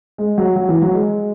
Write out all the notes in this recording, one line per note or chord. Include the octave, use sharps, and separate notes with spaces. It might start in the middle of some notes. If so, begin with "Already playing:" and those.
G#3
F#3
F#3
E3
F#3
G#3